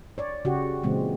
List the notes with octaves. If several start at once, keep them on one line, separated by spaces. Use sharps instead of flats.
C#5 D5
C#3 F#4 G4
A#2 C#3 E3 G#3 C4